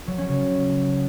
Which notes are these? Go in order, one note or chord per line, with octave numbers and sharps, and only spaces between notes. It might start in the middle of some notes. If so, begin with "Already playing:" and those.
F#3
C#4
C#3